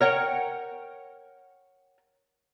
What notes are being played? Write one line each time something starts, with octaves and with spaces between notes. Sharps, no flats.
A#4 C#5 F#5 G5